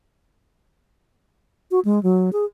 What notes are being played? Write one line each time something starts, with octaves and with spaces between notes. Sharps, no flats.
F#4
G#3
F#3
G#4